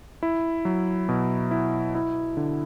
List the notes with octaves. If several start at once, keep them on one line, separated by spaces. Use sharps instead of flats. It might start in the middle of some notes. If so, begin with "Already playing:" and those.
E4
F#3
B2
E4
E4
D3